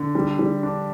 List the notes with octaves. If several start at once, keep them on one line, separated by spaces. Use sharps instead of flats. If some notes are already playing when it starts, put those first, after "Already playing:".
Already playing: D3
G3
G3
D4